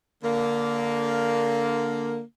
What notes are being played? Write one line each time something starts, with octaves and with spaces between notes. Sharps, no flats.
D3 A#3